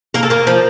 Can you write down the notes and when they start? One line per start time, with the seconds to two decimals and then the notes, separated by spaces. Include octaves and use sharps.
0.14 A#3 A#4
0.23 A4
0.30 A#3 A#4
0.47 F3